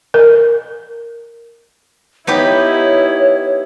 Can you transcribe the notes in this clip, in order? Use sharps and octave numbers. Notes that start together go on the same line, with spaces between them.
A#4
B3 D#4 E4 G4 C#5